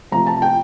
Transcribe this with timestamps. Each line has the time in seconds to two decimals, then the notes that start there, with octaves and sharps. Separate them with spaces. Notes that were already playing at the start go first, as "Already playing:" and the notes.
0.12 C3 F3 A3 A#5
0.27 A5
0.42 G5